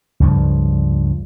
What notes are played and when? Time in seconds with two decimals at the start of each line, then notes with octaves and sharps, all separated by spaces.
0.20 C#2 G2 F3